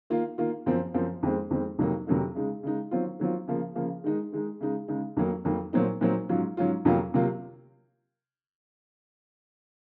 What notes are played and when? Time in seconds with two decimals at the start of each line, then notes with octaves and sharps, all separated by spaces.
0.10 D#3 A#3 F4
0.38 D#3 A#3 F4
0.66 F#2 F3 C4
0.94 F#2 F3 C4
1.23 F2 D#3 G#3 C4
1.51 F2 D#3 G#3 C4
1.79 F2 C3 F#3 A#3 D#4
2.07 F2 C3 F#3 A#3 D#4
2.35 C#3 G#3 D#4
2.63 C#3 G#3 D#4
2.91 D#3 F#3 C4 F4
3.20 D#3 F#3 C4 F4
3.47 C#3 F3 A#3
3.75 C#3 F3 A#3
4.04 D#3 G#3 D#4
4.32 D#3 G#3 D#4
4.61 C#3 G#3 D#4
4.88 C#3 G#3 D#4
5.17 F2 D#3 F#3 A#3 D#4
5.45 F2 D#3 F#3 A#3 D#4
5.73 A#2 F#3 C4 D#4
6.01 A#2 F#3 C4 D#4
6.29 G#2 F#3 C#4 F4
6.57 G#2 F#3 C#4 F4
6.85 F2 C3 F#3 A#3 F4
7.14 C3 F#3 A#3 F4